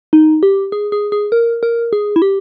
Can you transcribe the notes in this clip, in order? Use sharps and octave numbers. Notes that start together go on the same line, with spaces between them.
D#4
G4
G#4
G#4
G#4
A#4
A#4
G#4
E4
G4